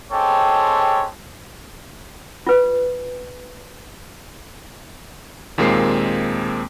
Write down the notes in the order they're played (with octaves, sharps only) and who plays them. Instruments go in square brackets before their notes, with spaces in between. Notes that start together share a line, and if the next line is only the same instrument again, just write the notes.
[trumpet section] G#3 C4 G4 A4 C#5
[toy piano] F4 B4
[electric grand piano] D#2 A#2 G#3 A#3 C4 C7